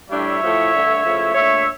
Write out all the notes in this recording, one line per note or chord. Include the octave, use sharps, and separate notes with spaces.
A2 G3 D4 C#5 E5
A2 F3 A3 E4
G2 D3 A3
C#3 F3 A3 E4
A#2 A3 D4 C#5 E5